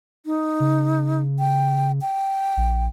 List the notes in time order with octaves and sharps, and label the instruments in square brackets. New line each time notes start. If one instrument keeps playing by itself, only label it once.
[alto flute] D#4
[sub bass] C#3
[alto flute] G5
G5
[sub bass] A#1